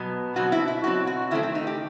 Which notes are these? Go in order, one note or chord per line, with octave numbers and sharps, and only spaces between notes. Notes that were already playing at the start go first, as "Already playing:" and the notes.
Already playing: B2 F#3 B3
B2 F#3 C4 F#4
E4
E4
B2 F#3 C4 F#4
F#4
D#3 A3 C4 E4
C4
D#4
G4